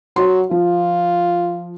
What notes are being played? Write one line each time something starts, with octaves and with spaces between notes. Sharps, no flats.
F#3 F#4 C6
F3 F4